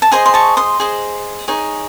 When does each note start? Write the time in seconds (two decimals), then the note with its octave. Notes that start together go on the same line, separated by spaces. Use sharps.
0.02 A5
0.12 G#4 C5 D#5 G#5 C6
0.26 C6
0.34 A5 C#6
0.57 C6 D#6
0.80 G#4 C5 D#5
1.48 D#4 G#4 C#5